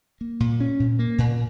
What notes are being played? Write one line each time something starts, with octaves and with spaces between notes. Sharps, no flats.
A#3
A#2
C#4
A#2
A#3
A#2